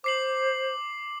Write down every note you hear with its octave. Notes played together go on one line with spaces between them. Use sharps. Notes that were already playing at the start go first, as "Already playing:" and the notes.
C5 D6 C7 F#7